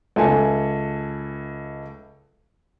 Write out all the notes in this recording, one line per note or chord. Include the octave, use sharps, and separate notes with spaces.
C#2 A4 E5 G#5